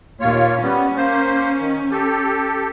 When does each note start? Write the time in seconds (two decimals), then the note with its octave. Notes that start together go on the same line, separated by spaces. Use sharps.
0.20 D#2 A#2 F4 C#5
0.62 G3 B3 C#4
0.97 A#3 C5
1.61 D#3
1.91 G4 A4